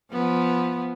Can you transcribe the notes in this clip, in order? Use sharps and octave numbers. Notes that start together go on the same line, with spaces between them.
F3 B3